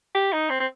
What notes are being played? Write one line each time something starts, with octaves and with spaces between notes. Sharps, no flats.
G4
D#4
C4
C4